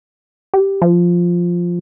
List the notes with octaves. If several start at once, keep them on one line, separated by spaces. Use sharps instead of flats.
G4
F3